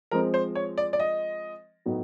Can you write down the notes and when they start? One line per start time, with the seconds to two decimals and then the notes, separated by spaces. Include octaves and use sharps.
0.11 F3 G#3 C4 A#4
0.34 C5
0.55 C#5
0.78 D5
0.93 D5
1.00 D#5
1.86 A2 F#3 B3 D#4 F#4